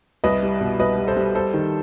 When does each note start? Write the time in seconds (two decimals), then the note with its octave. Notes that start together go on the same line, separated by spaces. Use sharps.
0.24 C2 B4 D#5
0.42 G3
0.61 B2
0.80 C2 B4 D#5
0.98 G3
1.07 A4 C5
1.16 G3
1.35 G3 A4 C5
1.54 D#3